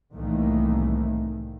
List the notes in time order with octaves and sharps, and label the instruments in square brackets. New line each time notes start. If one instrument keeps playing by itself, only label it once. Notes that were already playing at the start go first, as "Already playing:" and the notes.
[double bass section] C2 A2 D#3 E3 A3 A#3